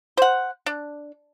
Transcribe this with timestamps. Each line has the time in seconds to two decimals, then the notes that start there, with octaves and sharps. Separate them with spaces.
0.17 C5 F#5
0.66 D4